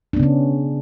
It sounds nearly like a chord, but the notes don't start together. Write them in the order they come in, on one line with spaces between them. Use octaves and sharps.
D4 B3 C#3 C#4